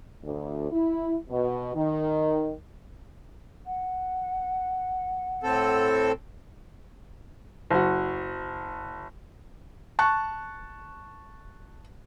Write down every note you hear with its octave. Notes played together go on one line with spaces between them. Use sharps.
D2
E4
B2
D#3
F#5
A2 C4 A4
F#1 F#4
A5 C#6 F#6